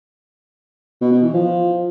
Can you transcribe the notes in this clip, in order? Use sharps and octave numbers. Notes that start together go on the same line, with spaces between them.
B2
B2
E3
F3